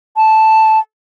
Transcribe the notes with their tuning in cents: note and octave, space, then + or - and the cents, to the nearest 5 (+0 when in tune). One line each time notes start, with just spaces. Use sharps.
A5 -5